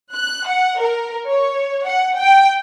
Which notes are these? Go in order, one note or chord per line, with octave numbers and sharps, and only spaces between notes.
F#6
F#5
A#4
C#5
F#5
G5